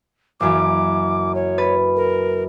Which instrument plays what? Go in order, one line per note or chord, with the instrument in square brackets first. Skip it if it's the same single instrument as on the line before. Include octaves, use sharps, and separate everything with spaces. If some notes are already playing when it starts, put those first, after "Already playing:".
[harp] F#1 F#2 E3 [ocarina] D6
[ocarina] C#5
[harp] B4 A6
[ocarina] A#4